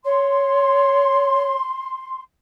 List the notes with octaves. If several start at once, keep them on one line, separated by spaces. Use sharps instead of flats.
C#5 C6